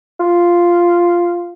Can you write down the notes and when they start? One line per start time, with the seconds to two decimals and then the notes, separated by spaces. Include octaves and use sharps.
0.20 F4